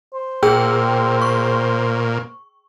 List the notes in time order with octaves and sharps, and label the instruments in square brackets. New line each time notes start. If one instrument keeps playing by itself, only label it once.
[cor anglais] C5
[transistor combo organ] A#2 [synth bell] G#4 G5 E6
[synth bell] C#6